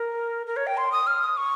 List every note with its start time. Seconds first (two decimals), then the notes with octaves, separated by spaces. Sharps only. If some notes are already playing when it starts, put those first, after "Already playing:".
Already playing: A#4
0.47 A#4
0.57 C#5
0.67 G5
0.77 C6
0.92 D#6
1.07 F6
1.22 D#6
1.37 C#6